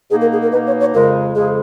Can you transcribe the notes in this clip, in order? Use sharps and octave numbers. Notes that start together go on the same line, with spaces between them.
B2 A#3 D#4 G#4
A#4
G#4
A#4
B2 A#3 D#4 B4
C#5
C#5
F2 C#3 G#3 A#4
F2 C#3 G#3 G#4